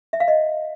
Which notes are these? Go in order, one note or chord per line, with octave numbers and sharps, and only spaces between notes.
E5
F5
D#5